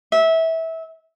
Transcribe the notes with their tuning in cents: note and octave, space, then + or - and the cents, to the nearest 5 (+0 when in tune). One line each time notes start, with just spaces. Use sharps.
E5 -20